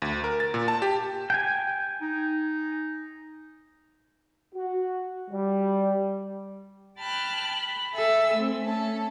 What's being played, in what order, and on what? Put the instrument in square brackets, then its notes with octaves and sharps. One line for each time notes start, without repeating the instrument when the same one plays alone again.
[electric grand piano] D2
A#4
A6
A#2
A5
G4
[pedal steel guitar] G5 G#5
[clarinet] D#4
[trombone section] F#4
G3
[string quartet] G5 A5 B5 F6 F#6
B5
A4 E5 G#5 E6
A3 C4
A3 C#4 A4